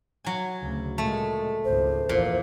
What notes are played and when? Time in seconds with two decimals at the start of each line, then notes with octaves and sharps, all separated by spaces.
0.25 F#3 G#5
0.60 D2 C#3
0.98 A#2 G#3 A3
1.65 G#1 C#2 C5
2.09 A#1 E2 A#2